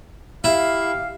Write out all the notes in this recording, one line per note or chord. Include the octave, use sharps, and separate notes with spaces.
E4 G4 F5